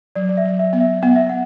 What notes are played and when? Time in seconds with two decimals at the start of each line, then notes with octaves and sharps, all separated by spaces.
0.15 F#3 D5
0.29 D5
0.37 E5
0.45 F#3
0.59 E5
0.73 B3
0.80 E5
1.02 B3 F#5
1.16 E5
1.29 F#5